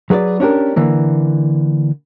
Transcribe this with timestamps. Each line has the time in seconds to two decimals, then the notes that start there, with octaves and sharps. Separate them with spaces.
0.10 F#3 G#4 B4 C#5 D5
0.40 C#4 D4 G4 A#4
0.76 D3 E3 A#3